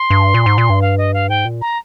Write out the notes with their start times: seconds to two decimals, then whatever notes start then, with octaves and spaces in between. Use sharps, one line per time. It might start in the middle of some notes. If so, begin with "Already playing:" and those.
Already playing: C6
0.10 G2
0.34 A#2
0.46 G#2
0.58 A#2
0.70 G2
0.82 F5
0.98 D#5
1.14 F5
1.29 G#2 G5
1.45 A#2
1.61 A#5